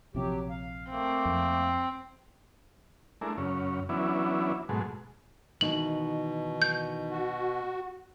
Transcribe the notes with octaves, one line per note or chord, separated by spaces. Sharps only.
A#1 C3 F3 F#3 G4
F5
A3 A#3 C4
F2
G#3 A3 D4 E4 A#4
F#2 C#3 C#4
E3 F#3 B3 C#4 D4 E4
G#2 B2 F#3 G#3 A3
B2 D#3 E3 D#4 F#7
G6
F#4